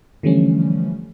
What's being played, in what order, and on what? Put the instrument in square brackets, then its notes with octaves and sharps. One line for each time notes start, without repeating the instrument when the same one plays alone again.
[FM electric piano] D3 E3 F3 G3 A3 C#4